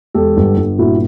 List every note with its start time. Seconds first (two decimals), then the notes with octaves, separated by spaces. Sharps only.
0.15 E1 G4 A4
0.37 G1
0.58 G1
0.78 A#2 E4 F#4